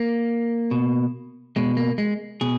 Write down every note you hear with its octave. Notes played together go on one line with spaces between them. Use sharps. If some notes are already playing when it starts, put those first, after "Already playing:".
Already playing: A#3
B2
B2 G#3
A#3
G#3
B2 G#4